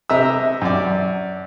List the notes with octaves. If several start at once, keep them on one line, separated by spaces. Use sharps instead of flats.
C3 D#5 E5 A#5 E6
F#2 D5